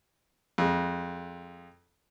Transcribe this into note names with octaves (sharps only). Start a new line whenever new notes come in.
F2 G#3